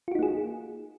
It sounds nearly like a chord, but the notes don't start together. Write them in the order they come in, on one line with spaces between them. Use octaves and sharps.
F4 F#4 D#4 A#3 G#4